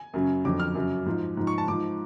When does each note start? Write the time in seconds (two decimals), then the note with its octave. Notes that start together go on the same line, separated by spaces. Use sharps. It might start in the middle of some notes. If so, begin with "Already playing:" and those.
Already playing: G#5
0.14 F#2 C#3 F#3
0.45 F2 D3 F#3 D6
0.60 F6
0.75 F#2 C#3 F#3
1.06 G#2 F3
1.37 G#2 F3
1.47 C#6
1.58 A5
1.67 G#2 F3 D6